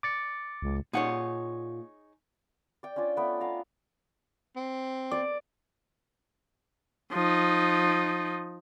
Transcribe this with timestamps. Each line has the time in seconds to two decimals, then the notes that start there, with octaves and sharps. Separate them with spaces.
0.03 D6 A6 C#7
0.62 C#2
0.93 A#2 D#4 G#4 C#5 F#5
2.83 D5 G5
2.96 C#4 D4 F4 D5
3.16 A3 B3 G5
3.41 B3 F5 A#5
4.56 C4
5.11 D5
7.12 F3 D#4